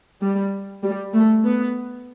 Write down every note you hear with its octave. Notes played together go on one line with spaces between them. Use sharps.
G3
G3
A3
B3